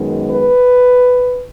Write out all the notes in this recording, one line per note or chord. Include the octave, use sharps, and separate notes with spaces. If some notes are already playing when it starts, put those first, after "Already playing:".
Already playing: F#2 D#3 G#3 B3
B4